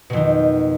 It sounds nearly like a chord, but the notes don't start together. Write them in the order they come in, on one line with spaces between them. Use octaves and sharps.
B2 F2 D#3